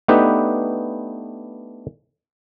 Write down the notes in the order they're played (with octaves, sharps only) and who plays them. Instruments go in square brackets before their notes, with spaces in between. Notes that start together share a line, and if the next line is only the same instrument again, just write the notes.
[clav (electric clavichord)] A3 B3 D4 D#4 G4 B4